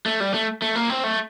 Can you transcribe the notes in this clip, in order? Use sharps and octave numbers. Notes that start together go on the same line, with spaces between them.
A3
G3
A3
A3
A#3
C4
A3